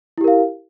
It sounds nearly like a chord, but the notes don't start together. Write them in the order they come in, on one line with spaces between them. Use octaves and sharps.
E4 G4 A#4 F5